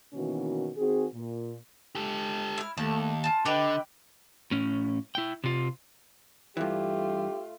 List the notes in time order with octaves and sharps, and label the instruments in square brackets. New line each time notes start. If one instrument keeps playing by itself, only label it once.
[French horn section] B2 D#3 E3 A#3 C#4 F#4
D#3 C4 F#4 G#4
A#2
[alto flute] G#3 [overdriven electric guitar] G4 A4
[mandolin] E4 F6
[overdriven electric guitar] D#2 [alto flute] A3 [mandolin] A5
[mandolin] F4 A5 [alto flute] G#5
[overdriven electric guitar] D3 [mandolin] G4 B4 G5 [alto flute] D#5
[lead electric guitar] A2 C#4
E4 G5
C3 F4
[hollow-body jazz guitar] G2 E3 [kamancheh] A3 F4 [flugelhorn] G4